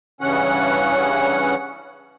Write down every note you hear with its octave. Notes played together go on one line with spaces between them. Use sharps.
G2 C#3 E3 C#4 F#5